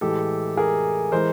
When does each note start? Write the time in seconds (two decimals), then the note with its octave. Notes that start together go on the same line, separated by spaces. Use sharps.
0.01 A2 E3 G#3 G4 A4
0.57 G#4 A#4
1.12 E3 G#3 A#4 C5